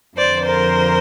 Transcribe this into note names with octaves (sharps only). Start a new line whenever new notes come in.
F2 D3 F3 C5 D5
A#4 C5